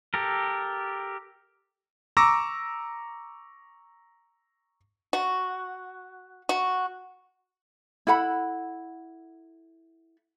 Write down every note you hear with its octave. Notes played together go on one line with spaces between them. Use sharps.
G4 A4 A#4
A#5 C#6 D6 E6 A#6
F#4
F#4
E4 A4 F#5 B5